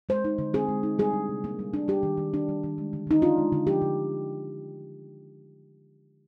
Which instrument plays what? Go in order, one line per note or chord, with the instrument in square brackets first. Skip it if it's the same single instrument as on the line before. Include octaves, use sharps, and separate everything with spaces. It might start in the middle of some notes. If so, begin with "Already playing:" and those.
[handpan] G#3 C5
D#4
D3
C4 G#4
G#3
D#4
G3 G#4
D4
C3
A#3
G3
D4
G3 G4
D#3
D#3
D4
G3
D#3
G#3
D3
D3 D#4
D4 F4
G#3
D3
F3 G4
D3